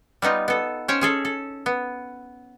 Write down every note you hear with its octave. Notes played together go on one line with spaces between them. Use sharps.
G3 B3 D#4 F4
B3 A4
C#4 C5 C#5 G5
C#4 G#4 A4
A4
B3